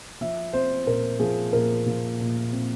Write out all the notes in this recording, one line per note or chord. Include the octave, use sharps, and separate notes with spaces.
F3 E5
C4 C5
A#2 A#4
F3 G#4
A#2 A#4
F3
A#2
C4